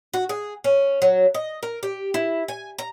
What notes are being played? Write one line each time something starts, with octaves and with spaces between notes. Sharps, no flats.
F#4
G#4
C#4
F#3
D#5
A#4
G4
E4
G#5
A#5